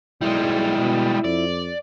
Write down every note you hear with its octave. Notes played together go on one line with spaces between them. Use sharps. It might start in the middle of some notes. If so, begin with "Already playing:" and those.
B1 G3 G#3 E4
B2
F2 D5